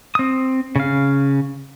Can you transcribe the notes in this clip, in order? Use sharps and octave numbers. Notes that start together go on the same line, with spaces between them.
C4 D#6
C#3 F5